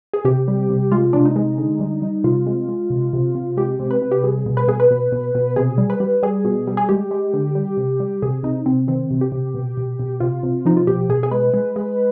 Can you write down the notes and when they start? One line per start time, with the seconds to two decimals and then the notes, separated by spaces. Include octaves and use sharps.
0.13 G#4
0.25 C3 G4
0.48 G3
0.70 C3
0.92 G#3 F4
1.13 C3 D4
1.25 D#4
1.36 G#3
1.58 D3
1.80 G3
2.02 G3
2.24 C3 F4
2.46 G#3
2.69 G#3
2.90 C3
3.13 C3
3.35 C3
3.57 G#3 G4
3.79 C3
3.91 B4
4.02 C3
4.11 G4
4.24 G3 G#4
4.46 B2
4.57 B4
4.67 B2 G#4
4.80 B4
4.91 B2
5.12 B2
5.35 B2
5.56 C3 G#4
5.78 G3
5.90 B4
6.00 G3
6.23 G3 G#4
6.45 B2
6.67 G3
6.77 G#4
6.89 G#3 G4
7.11 G#3
7.33 D3
7.55 G3
7.77 C3
8.00 G3
8.22 C3 G#4
8.43 C3 D#4
8.66 C3 C4
8.88 D#3 C4
9.11 C3
9.21 G4
9.32 C3
9.54 B2
9.77 B2
9.99 B2
10.20 C3 F4
10.43 C3
10.65 F3 D#4
10.77 F4
10.87 B2 G4
11.09 B2 G#4
11.23 G#4
11.31 G#3 B4
11.54 G#3
11.76 G#3